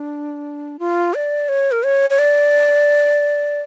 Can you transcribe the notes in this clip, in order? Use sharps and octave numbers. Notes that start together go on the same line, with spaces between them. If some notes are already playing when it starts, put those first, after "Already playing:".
Already playing: D4
F4
D5
C#5
A#4
C#5
C#5
D5